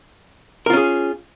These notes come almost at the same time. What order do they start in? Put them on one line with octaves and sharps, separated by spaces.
A#4 F4 C#4 G#4